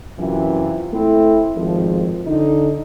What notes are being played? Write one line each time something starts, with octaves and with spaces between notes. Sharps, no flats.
F#2 C3 E3 F4
A3 C4 E4
G#1 F2 F3
D3 D#4